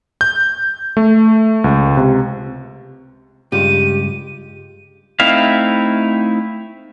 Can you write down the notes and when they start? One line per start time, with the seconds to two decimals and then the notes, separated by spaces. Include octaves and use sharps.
0.21 G6
0.97 A3
1.64 C#2
1.97 C3
3.52 G2 C#3 G#3 F4 G4 D#7
5.20 A3 C4 D#4 E4 F5